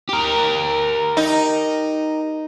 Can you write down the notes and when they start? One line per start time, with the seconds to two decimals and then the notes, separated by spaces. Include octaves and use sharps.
0.09 G4 A#4
1.17 D#4